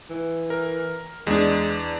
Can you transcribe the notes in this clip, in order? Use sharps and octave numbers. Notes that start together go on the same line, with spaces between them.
E3
A#4
E2 G#3 D4